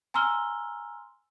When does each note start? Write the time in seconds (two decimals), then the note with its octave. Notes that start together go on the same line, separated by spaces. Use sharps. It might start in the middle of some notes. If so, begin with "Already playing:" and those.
0.14 G#5 A#5 C6 E6 F6 G7